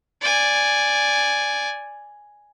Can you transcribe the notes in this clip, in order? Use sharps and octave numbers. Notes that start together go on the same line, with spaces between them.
D5 G#5